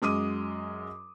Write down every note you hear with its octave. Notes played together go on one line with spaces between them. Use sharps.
F#2 G#3 D6 D#6 D#7